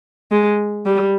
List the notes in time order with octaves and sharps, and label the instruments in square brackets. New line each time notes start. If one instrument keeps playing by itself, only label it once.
[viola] G#3
G3